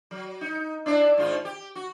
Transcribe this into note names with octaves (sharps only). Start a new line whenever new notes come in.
F#3
D#4
D4 E4 D5
G#2 D#3 F4
G4
F#4